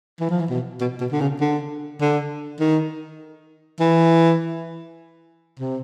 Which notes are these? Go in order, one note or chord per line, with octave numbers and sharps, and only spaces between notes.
E3
F3
E3
B2
B2
B2
D3
C#3
D3
D3
D#3
E3
C3